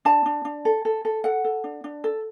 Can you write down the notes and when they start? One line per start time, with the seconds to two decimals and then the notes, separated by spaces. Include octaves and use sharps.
0.05 D4 A5
0.26 D4
0.45 D4
0.65 A4
0.85 A4
1.05 A4
1.24 A4 F#5
1.44 A4
1.64 D4
1.84 D4
2.04 A4